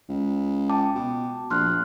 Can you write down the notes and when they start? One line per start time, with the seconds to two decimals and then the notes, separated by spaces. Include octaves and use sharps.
0.09 C#2
0.70 G5 A5 D6
0.95 B2
1.50 A#1 C6 F6 F#6